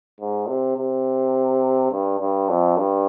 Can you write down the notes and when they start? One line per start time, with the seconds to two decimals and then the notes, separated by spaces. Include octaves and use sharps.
0.21 G#2
0.48 C3
0.77 C3
1.92 G2
2.20 G2
2.49 F2
2.77 G2